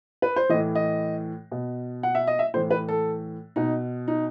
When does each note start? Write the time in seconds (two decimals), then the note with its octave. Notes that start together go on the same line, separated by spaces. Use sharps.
0.22 B4
0.36 C5
0.49 E3 D#5
0.53 A2
0.75 D#5
1.52 B2
2.03 F#5
2.15 E5
2.27 D#5
2.39 E5
2.54 A2 C5
2.57 E3
2.71 B4
2.89 A4
3.56 B2 D#4
4.08 D#4